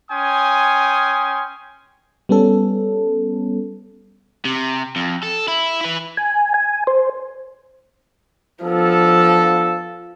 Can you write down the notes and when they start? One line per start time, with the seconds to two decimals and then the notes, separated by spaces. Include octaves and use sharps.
0.11 C#4 G5 G#5 C6 D#6
2.29 G3 B3 C#4 A4
4.45 C3
4.96 F2
5.23 A4
5.48 E4
5.81 E4 B4
6.17 G#5
6.54 G#5
6.87 C5
8.64 F3 B3 D4 A4